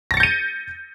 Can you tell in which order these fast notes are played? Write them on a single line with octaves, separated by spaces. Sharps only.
A#6 A6 C#7 G6 D#7